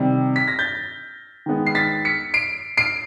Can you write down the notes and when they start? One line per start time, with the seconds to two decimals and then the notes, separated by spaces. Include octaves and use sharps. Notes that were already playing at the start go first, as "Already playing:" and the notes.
Already playing: C3 D#3 G3
0.36 B6
0.48 A#6
0.59 G6 A6
1.46 D#3 G#3 B3
1.66 C7
1.75 A6 B6
2.05 B6 C#7
2.34 C7 D7
2.77 C7 D7